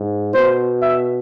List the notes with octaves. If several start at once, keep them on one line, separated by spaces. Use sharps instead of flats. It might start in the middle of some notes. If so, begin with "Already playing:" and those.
Already playing: G#2
B2 C5
E5